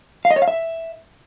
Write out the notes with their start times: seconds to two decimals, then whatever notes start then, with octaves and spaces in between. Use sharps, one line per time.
0.25 F5
0.31 D#5
0.36 C#5
0.42 F5
0.48 E5